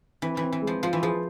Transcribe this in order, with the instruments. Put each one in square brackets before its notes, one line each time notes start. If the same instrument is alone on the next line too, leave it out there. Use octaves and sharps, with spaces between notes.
[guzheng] E3 [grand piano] C4
[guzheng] E3
[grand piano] C4
[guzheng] E3
[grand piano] G#3
[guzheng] F3
[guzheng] F3 [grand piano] F4
[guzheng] E3
[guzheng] F3 [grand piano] G#4